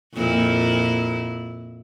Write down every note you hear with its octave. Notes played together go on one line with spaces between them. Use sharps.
F2 A#2 E4